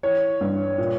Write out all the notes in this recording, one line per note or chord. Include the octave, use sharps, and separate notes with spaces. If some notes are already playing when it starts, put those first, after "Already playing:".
E3 C#5
G2
A#2